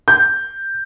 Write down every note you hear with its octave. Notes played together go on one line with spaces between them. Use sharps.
G6